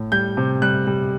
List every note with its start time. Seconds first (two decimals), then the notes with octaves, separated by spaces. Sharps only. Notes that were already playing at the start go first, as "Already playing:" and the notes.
Already playing: A2
0.12 G3 G6
0.37 C3
0.62 G3 F#6
0.87 G3